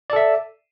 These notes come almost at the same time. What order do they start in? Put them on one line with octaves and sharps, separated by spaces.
D5 A4 E5